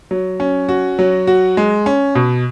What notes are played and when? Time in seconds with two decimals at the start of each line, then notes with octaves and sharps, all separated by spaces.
0.11 F#3
0.40 C#4
0.69 F#4
0.99 F#3
1.27 F#4
1.57 G#3
1.86 C#4
2.15 B2